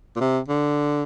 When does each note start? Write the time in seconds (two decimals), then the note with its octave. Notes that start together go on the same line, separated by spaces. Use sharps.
0.16 A#2
0.20 C3
0.48 D3